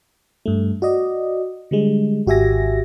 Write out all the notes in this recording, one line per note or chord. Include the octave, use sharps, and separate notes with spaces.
G2 A3
F#4 D5 D#5
D3 G3 G#3
G#1 F#4 G4 E5 G#5 A#6